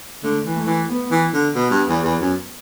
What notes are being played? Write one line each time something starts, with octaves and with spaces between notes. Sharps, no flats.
D3 A3
E3
A3
E3
B3
E3
D3
B2 B3
G2
E2
E2
F#2